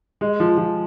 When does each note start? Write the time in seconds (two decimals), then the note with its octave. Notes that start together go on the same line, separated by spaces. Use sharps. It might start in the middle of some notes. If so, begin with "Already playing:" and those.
0.21 G#3
0.40 F3
0.57 F3